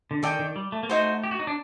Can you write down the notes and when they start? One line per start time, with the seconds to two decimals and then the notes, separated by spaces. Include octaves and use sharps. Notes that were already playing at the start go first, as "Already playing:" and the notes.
0.11 D3
0.23 D#3 A4 D5 G5 D6
0.39 D#3
0.56 G3
0.72 A3
0.83 A#3
0.89 A3 D#4 F#4 C5
1.24 G4
1.31 F#4
1.39 D#4
1.47 D4